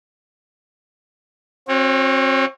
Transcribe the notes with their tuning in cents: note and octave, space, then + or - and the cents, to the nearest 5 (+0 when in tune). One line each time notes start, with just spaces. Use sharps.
C4 +35 F#4 -30 C#5 +0